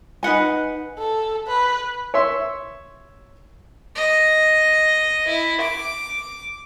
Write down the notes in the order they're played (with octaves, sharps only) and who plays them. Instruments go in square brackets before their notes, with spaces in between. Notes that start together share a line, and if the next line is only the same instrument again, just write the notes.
[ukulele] D#4 B4 F#5 G#5
[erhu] A4
B4
[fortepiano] C#5 E5 C6
[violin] D#5
E4
D6